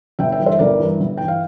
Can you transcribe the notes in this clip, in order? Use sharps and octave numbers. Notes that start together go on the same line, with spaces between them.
G1 E5 G5
E5 G5
G2 E3
C5 E5
G1 A#4 D5
G2 E3
G1
E3 G5
F5